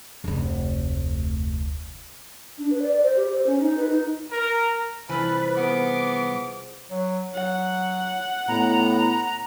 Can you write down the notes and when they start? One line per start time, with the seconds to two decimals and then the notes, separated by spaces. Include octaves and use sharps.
0.24 F1 D2
2.58 D4
2.70 B4
2.81 D5
3.02 C5
3.16 G4
3.31 C5
3.46 C#4
3.59 D#4
3.77 B4
3.88 D#4
4.31 A#4
5.09 C2 E3 F3 A4 B4 G#5
5.57 B3 G#4 D6
6.90 F#3
7.34 F#3 F#5
8.48 A2 B3 A#5